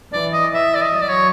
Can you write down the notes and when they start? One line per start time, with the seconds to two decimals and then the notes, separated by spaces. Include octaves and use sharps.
0.13 E3 D5
0.33 D#5
0.54 E5
0.75 D5
0.81 D#5
0.95 F#3
1.02 D5
1.09 C#5